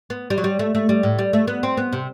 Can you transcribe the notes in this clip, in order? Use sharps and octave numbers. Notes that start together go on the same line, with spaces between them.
B3
G3
F#3
G3
A3
A3
G3
A2
G3
A3
B3
C4
B3
C3